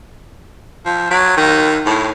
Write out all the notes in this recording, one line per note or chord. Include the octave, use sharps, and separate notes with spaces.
F3
F#3
D#3
A2